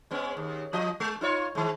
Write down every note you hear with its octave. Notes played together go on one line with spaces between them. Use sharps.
G#3 B3 C#4
D#2
F3 F4 D#5
G#3
D#4 F4 C#5
D#3 G#3